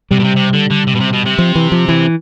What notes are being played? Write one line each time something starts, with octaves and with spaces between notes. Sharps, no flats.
C3 G3
B2
C3
C3
D3
D3
C3
B2
C3
B2
C3
F3
E3
F3
E3